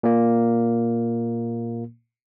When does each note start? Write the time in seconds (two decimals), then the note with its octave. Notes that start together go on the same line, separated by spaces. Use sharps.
0.03 A#2 A#3